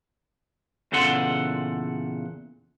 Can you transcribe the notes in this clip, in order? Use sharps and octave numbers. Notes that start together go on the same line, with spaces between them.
E2 A#2 C#3 A4 F#5 C6